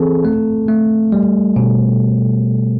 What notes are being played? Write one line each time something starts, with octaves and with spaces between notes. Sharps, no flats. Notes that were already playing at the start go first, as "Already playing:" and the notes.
Already playing: E3 C4 G#4 A4
A3
A3
G3
B2